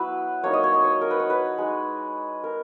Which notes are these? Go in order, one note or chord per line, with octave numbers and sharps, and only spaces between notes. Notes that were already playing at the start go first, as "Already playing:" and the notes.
Already playing: F#3 B3 E4 B4
F#3 A#3 D#4 C#5
D#5
C#5
D#5
C#5
A#4
B4
C#5
B4
G#3 D#4
A#4